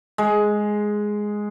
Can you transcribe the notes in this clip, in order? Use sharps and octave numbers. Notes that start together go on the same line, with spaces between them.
G#3